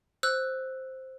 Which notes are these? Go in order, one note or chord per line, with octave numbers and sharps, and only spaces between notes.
C5 E6 F#6